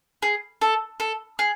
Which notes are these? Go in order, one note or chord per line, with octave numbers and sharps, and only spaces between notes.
G#4
A4
A4
G#4